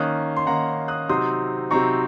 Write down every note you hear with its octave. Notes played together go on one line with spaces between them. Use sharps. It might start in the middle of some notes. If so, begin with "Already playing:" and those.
Already playing: D#3 A#3 C#4 D#6 F#6
C6
D#3 A#3 C#4 F#5 A#5
D#6 F#6
C3 F#3 C4 D#4 C6 D#6
C3 F#3 C4 D#4 A#5 C#6